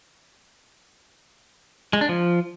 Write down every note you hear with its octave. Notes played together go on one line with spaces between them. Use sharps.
G#3
D4
F3